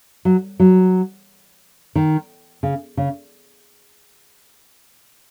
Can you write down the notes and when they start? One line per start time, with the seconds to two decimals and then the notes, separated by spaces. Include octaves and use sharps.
0.25 F#3
0.60 F#3
1.95 D#3
2.63 C#3
2.97 C#3